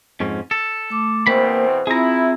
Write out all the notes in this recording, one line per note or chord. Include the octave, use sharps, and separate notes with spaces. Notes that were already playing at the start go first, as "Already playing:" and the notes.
F2 G#2 C#4
A4
A3 D6
E2 B2 A#3 C4 C5 B5
C4 E4 F4 G#4 A#5